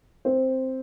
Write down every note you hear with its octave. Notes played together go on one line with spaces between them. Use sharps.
C4 C5